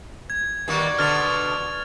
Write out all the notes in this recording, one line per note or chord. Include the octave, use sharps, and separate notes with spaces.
G#6
D#3 G3 A#3 F#4 D5
B2 D3 F6 A6 F7